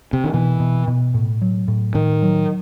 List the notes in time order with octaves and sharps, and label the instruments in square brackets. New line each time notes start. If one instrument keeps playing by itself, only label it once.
[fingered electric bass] C3
D#3
[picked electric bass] B2 [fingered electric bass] E3
[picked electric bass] B2
B2
A2
F#3
A2
[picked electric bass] A2 [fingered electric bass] D#3
[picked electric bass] F#3